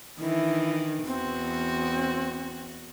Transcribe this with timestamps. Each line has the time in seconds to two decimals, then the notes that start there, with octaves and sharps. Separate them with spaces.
0.19 D#3 E3 D4 E4
1.05 E2 C4 F#4